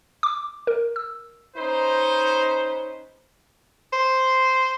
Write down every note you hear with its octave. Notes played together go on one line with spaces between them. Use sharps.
D6
A#4
E6
C#4 D#4 B4 C5
C5